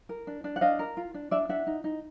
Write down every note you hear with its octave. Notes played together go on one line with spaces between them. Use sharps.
A#4
D4
D4
F#5
D4 D#5 F5
A#4
F4
D4
D4 D5 E5
D4 E5 F#5
D#4
D#4